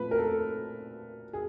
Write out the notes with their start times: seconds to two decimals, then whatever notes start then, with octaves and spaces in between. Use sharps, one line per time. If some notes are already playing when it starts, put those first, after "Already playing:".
Already playing: A#2 F3 A3 C4 B4
0.11 A#4
0.18 A4
1.33 G#4